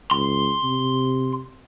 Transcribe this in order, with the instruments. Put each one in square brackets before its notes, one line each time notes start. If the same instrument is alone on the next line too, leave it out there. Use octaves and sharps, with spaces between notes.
[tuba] C#2 [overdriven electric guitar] C6
[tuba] C3